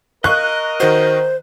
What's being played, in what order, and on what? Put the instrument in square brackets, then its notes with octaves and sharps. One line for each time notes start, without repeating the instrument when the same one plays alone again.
[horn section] A#4 D#5 [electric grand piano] F5 C#6 [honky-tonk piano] F#6
[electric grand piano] D#3 F#4 [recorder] C5